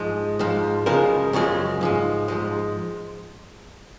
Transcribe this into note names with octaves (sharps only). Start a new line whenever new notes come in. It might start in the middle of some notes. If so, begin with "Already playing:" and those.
Already playing: G#2 F3 G#3
G#2 F3 G#3
F#2 C#3 F3 G#3 A#4
F#2 C#3 F3 G#3
G#2 F3 G#3
G#2 F3 G#3